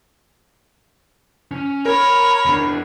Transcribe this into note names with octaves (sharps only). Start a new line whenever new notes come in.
C#4
A#4 C#5 A#5 B5
E2 D4